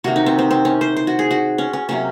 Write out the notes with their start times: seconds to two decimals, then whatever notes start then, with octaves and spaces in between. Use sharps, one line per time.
0.04 C3 D#3 A#3 F#4
0.16 D#4
0.26 C4
0.39 C4
0.51 C4
0.65 C#4
0.81 C5
0.97 C5
1.07 F#4
1.19 G#4
1.31 F#4
1.58 C#4
1.73 C#4
1.89 C3 F#3 A#3 C#4